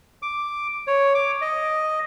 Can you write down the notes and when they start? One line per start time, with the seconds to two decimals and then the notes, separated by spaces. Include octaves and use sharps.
0.22 D6
0.87 C#5
1.15 D6
1.41 D#5